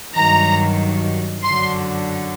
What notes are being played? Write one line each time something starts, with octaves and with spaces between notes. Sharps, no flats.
G2 D#3 F#3 A#5
F#2 D3 F#3 C6